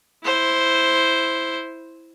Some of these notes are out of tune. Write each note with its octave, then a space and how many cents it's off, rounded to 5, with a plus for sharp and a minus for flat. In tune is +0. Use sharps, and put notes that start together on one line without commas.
E4 +0 C5 +0